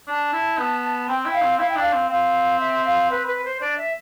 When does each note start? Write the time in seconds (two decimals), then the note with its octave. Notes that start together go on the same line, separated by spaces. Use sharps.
0.07 D4 A5
0.33 E4
0.58 B3
1.08 C4 G5
1.25 E4
1.33 F5
1.42 C4
1.59 E4 F5
1.69 G5
1.76 D4 F5
1.92 C4
2.10 C4 F5
2.59 E5
2.85 F5
3.10 B4
3.27 B4
3.44 C5
3.61 D4 D5
3.78 E5